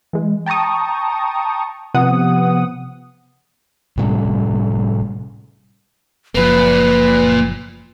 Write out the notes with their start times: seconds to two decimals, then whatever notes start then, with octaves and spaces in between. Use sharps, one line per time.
0.13 E3 G#3
0.46 G5 A5 A#5 C#6 D#6
1.94 C3 F3 B3 F#5 D#6
3.97 A2 C3 G3 C#4
6.35 F#1 F3 A#3 F4 B4